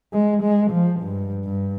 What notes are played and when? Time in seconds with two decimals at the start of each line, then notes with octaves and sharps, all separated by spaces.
0.13 G#3
0.42 G#3
0.71 F3
1.01 G2
1.45 G2